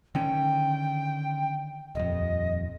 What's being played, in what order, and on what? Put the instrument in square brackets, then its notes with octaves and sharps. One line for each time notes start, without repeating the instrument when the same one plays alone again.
[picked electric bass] D3 D#3 C#4 [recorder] G5
[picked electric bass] D#1 F2 [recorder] D#5